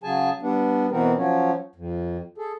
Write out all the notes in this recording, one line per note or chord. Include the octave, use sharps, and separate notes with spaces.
C#3 F#3 G#4 G#5 A5
G3 B3 D4
B2 E3 B3 C4 A#4
F3 F#3 C#4
F2
G#4 A4